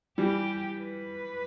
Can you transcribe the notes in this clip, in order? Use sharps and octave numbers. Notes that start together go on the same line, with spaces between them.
E3 G3 G4
B4